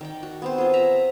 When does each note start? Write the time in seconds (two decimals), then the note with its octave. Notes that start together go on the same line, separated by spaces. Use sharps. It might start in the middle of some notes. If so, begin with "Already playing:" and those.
0.01 D#3 D5 G5
0.23 F#4
0.42 B3 C4 C5
0.58 F4 G#4
0.74 E5 A#5